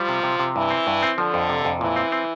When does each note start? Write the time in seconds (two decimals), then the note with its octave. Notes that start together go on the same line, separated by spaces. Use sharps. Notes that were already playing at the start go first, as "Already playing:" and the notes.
Already playing: F3 G3
0.09 C3
0.23 C3
0.39 C3
0.55 G2 E3
0.70 C4
0.87 G2
1.03 C4
1.18 D3 F3
1.34 F2
1.49 C3
1.65 F2
1.80 A#2 E3
1.96 C4
2.12 C4